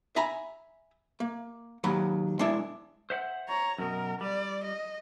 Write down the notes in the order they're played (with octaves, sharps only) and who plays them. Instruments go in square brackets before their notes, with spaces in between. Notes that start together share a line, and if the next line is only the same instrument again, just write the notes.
[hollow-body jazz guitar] E5 G#5 A#5 B5
A#3
D#2 F#3 B5
G#3 D4 E4
[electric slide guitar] C5 E5 F#5
[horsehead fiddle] C#5 A#5
[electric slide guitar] F#2 B2 [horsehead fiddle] A#4
[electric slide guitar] G3 [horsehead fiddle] D5
[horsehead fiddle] D#5